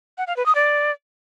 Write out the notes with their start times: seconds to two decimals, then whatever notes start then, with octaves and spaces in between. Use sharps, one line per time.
0.18 F#5
0.27 F5
0.37 B4
0.46 D#6
0.55 D5